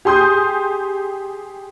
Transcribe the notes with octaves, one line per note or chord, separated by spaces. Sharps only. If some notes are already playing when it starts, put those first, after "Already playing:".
G4 G#4 C6 D#6 G6